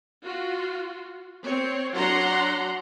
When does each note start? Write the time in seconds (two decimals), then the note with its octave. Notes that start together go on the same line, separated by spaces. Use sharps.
0.23 F4 F#4
1.45 C4 C#5
1.94 F#3 D4 F#5 A#5 C6